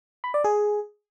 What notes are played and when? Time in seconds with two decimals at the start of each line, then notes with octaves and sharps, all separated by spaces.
0.24 B5
0.34 D5
0.44 G#4